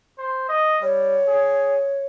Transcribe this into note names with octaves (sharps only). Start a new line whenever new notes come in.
C5
D#5
G3 C#5
G#4